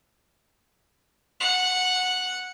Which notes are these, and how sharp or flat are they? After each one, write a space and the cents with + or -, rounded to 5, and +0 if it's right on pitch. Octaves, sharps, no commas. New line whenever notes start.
F#5 -10